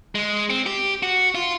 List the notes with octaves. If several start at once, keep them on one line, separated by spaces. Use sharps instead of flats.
G#3
C4
G4
F#4
F4